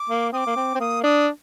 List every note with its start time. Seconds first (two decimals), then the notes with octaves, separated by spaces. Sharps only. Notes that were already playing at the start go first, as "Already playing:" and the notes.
Already playing: D6
0.10 A#3
0.33 C4 D#6
0.37 D6
0.46 A#3
0.56 C4
0.75 C4
0.80 A#3 D#6
1.04 D4 D#6